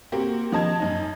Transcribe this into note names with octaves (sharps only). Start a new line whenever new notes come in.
A#3 C4 F#4 G4
F3 D#5 A5 G#6
F#2 D#4